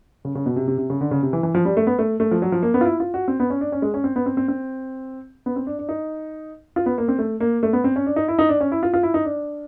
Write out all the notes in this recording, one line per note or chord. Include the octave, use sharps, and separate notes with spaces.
C#3
C#3
B2
C3
C3
C3
C#3
D3
C#3
C3
E3
E3
F3
G3
A3
B3
A3
A3
F3
F#3
F3
A#3
B3
F4
E4
F4
F#4
C4
B3
C#4
D4
C#4
G#3
C#4
C4
B3
C4
C4
C4
B3
C4
D4
D4
D#4
F4
B3
A#3
C4
A3
A#3
A3
B3
C4
C#4
D4
D#4
E4
D#4
D4
C#4
E4
F4
F4
E4
D#4
D4